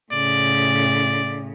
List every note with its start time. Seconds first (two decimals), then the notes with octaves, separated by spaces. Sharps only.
0.12 A2 C#3 D5